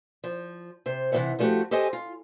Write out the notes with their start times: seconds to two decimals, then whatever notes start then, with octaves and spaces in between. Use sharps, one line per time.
0.24 F3
0.86 C3 C5
1.12 C3 E3 B3 D#4 E5 F#5
1.39 F3 G3 A3 B3 F#4 G4
1.71 G4 A4 C5 D#5 G#5
1.93 F4